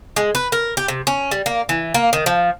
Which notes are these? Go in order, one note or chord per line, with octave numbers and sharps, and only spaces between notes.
G#3
B4
A#4
G4
C3
C#4
G3
A#3
E3
A#3
D#3
F3